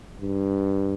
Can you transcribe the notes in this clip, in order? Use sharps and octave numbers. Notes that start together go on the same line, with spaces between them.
G2